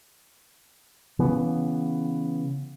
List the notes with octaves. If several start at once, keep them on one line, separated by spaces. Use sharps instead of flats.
C#3 E3 B3